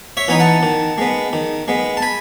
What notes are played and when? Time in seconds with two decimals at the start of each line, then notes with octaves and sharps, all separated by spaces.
0.17 C#5 E5
0.28 E3 B3 D#4 G#5
0.40 F#5 A5
0.63 D#3
0.98 G#3 B3
1.33 D#3
1.68 G#3 B3
1.97 A5
2.02 G#5 B5